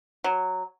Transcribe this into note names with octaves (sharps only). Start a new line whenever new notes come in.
F#3